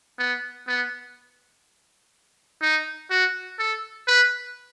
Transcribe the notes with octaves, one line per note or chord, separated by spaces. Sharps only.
B3
B3
D#4
F#4
A4
B4